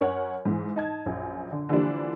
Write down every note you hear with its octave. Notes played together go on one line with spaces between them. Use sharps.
F#2 C#4 A#4 C#5 F#5
G#2 E3
D#4 A5 G#6
A#1 F#2
D3
D3 E3 F3 G3 A#3 D4